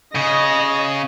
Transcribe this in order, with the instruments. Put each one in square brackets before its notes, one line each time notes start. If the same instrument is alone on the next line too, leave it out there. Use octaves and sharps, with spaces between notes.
[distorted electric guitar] C#3 [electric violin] D#5 A#6